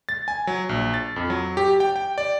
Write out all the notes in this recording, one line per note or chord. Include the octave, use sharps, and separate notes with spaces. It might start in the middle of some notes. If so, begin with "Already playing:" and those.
A6
G#5
F#3
A#1
A6
F2
F#3
G4
G5
G5
D5